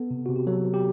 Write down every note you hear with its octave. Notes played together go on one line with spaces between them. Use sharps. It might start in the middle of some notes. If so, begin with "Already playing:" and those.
Already playing: B3 A4
C3
C3 F#4
G4
F#3 A4
F#3
G4